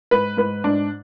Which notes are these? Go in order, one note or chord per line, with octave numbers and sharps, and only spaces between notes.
G#2 B4
G#2 B4
G#2 D4